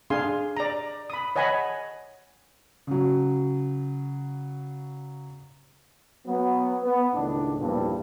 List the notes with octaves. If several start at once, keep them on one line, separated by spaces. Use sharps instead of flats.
D4 G#4 F5 G#5 C6
D5 A#5
B5 D#6
C#5 D#5 F#5 G#5 A5 B5
C#3 F#3
F#3 B3
B3
C#2 A2 D#3 D4
B1 E2 G2 A#2 F3